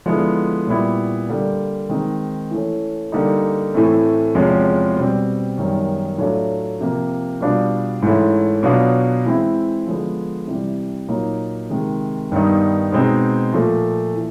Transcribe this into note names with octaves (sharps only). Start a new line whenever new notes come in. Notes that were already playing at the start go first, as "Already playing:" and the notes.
D3 F3 G#3 B3 E4
A#2 G3 B3 E4
D3 G3 A#3
D#3 G#3 C4 D#4
E3 A3 C#4
D3 G3 A#3 D#4
A2 E3 A3 C4
E2 C3 F3 G#3 C#4
B2 G3 C4
F#2 D#3 G3 B3
A2 F#3 A3 D4 F4
C3 F3 A#3
B2 G3 B3 D4 F4
G#2 E3 A3 C#4 E4
B2 F#3 B3 D4 F4
E3 G#3 C4 E4
D3 F3 G#3 B3
C3 E3 G3
A#2 F#3 A#3 D#4
C3 D#3 G#3
G2 D#3 G3 B3 D#4
B2 G#3 C4 D#4
A#2 F3 A3
E3